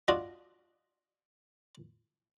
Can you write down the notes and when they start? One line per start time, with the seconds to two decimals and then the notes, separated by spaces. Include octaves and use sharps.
0.08 D4 F4 F#4 D#5